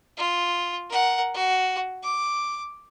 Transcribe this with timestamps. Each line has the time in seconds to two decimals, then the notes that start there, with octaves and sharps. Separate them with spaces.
0.17 F4
0.90 A#4 F#5
1.34 F#4
2.03 D6